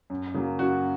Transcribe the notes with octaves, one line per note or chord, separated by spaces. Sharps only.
F#2
C#3 F#3 A#3
F#2 F#4